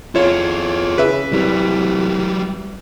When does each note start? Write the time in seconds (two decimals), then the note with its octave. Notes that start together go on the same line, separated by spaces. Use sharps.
0.15 F2 E4 F4 G#4 C#5
0.98 C#3 B4 E5
1.32 C2 F#3 G3